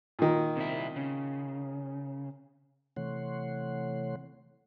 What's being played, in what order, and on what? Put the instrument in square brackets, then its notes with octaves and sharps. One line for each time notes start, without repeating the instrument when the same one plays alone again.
[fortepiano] A#2 D#3
[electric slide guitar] C3 E4
C#3
[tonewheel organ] C3 E3 A3 C#5 F#5 C6